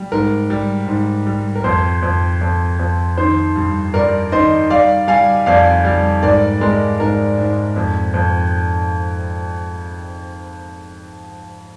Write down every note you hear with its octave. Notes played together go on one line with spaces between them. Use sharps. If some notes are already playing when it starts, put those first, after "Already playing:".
Already playing: G3
G#2 A#4
G3
G#2
G3
A#4
F2 C5
F2
F2
F2
D#3 C5
G2
G2 A#4 D5
D#3 C5 D#5
G3 D5 F5
G3 F5 G#5
F2 D5 F5
G3
G#2 A#4 D5
G#3 A#4
G#2 A#4
G#2
F2
F2